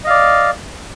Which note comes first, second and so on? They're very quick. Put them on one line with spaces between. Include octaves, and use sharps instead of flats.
D#5 F5 D5